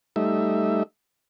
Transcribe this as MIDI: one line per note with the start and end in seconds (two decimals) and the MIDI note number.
0.16 0.83 55
0.16 0.83 57
0.16 0.83 63
0.16 0.83 76